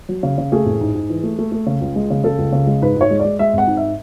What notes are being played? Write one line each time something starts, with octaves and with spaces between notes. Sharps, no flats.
F#3
C#3
C#3
A3 G#4
A1
G#2
G#2
E3
A3
A3
A3
C#3
C#2
G#3
C#3
C#3 A4
C#2
C#3
G#3
G#2 B4
G#2 C#5
G#3
D5
G#3
G#3 E5
G#1 F#5
G#2
E5